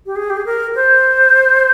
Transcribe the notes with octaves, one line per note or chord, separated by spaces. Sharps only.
G4
G#4
G4
G#4
A#4
C5